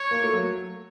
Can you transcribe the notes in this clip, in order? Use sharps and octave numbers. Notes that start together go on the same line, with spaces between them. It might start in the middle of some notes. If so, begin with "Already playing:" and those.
Already playing: C#5
A#3
A3
F#3